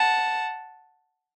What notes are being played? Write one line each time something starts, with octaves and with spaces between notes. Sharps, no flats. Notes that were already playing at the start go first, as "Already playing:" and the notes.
Already playing: F#5 A5